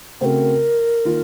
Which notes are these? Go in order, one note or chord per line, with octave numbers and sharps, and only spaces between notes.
C#3 A3 C4 F#4 A#4 C5
D#3 A#3 F4